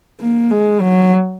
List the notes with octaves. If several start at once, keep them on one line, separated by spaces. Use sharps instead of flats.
A#3
G#3
F#3